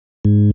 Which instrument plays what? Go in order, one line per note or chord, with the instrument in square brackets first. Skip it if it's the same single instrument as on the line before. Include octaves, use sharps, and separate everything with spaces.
[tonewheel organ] G#2